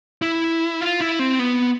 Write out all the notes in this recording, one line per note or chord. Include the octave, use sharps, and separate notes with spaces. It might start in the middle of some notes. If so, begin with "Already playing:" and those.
E4
F4
E4
C4
B3